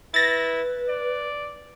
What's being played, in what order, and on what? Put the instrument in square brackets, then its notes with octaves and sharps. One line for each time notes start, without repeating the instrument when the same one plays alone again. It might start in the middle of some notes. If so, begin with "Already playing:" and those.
[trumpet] E4 [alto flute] B4 [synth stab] A6 A#6
[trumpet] D5